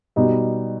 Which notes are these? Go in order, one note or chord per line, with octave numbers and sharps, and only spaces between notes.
B2 G3 D#4